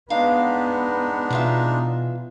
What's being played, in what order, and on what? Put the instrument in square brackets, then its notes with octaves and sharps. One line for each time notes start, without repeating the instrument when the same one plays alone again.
[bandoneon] G#3 D4 D#4 [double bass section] B3 [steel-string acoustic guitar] F5
[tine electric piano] B2 [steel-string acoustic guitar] E3 F4 E5